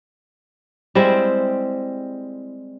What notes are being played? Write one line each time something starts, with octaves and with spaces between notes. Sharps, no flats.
G3 G#3 C4 E4